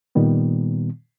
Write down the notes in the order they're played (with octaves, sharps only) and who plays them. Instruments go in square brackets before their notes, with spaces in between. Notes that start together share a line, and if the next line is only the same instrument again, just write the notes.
[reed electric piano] A#2 D#3 G3 B3